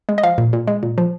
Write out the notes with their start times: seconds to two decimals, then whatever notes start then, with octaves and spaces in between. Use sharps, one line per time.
0.09 G#3
0.18 D#5
0.23 F3 F5
0.38 A#2
0.53 A#2
0.68 G#3
0.83 A#2
0.98 F3